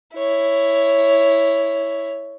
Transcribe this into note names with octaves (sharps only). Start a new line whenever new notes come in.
E4 C#5